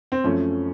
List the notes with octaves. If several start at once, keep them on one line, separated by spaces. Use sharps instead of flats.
C4
F#2 F3 A3 C#4